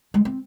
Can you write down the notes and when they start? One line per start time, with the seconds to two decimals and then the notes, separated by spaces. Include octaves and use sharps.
0.14 G#3
0.25 C4